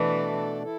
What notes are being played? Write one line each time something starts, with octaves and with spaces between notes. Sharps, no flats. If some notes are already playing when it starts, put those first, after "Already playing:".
Already playing: B2 E3 A3 D4 A4 D5
E4 A4